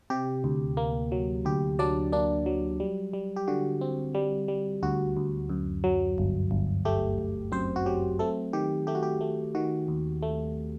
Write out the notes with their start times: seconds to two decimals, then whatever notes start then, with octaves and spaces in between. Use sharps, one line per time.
0.10 C3 G4
0.44 D2
0.77 A#3
1.12 F#3
1.45 D2 G4
1.79 F#3 D4 D5
2.12 A#3 D4 D5
2.46 F#3
2.80 G3
3.13 G3
3.36 G4
3.48 D3 F#4
3.81 C4
4.15 G3
4.48 G3
4.83 D2 F#4
5.17 D2
5.50 F#2
5.84 F#3
6.18 G1
6.51 G1
6.85 A3 G4
7.18 G1
7.52 F#2 C4 C5
7.76 F#4
7.86 F#3 G4
8.19 A3 C4 A4
8.53 D#3 G4
8.87 A3 G4
8.95 F#4
9.03 G4
9.21 A3
9.55 D#3 F#4
9.88 D#2
10.23 A3